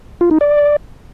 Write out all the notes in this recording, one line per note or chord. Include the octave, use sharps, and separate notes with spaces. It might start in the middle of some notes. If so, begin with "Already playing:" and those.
F4
D#4
D5